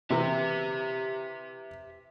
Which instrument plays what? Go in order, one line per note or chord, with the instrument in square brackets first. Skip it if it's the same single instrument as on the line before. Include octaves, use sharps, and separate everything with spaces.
[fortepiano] C3 E3 [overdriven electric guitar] G4 E5